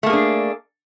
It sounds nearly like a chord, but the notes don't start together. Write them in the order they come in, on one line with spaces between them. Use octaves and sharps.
A3 A#3 G#4 D4